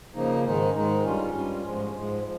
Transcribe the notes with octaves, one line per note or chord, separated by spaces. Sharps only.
C#3 F3 A#3 D#4
G#2 D#3 G#3 D#4
G#2 D#3 G#3 D#4
G2 G3 C#4 F4
G2 G3 C#4 F4
G#2 F3 G#3
G#2 F3 G#3
F3